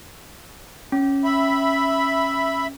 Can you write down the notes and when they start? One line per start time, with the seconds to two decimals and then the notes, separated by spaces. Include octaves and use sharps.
0.92 C#4
1.24 E5 B5